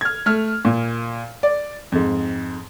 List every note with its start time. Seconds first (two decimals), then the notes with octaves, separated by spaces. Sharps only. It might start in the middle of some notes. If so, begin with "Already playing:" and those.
0.01 F6 G#6
0.26 A3 F6
0.65 A#2
1.43 D5
1.92 F2 G#2